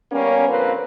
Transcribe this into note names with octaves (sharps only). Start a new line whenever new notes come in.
G3 A#3 B3 C#4
D3 F3 A#3 C4 B4 C5